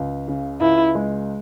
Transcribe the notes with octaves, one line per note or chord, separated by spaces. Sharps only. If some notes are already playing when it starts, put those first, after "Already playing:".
Already playing: C#2
C#3
C#2 E4
G#3